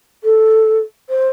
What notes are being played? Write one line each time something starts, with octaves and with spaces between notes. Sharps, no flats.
A4
C5